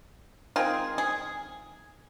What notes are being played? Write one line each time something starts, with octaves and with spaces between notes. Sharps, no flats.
D#3 G#3 C4 F4 G#4
G#4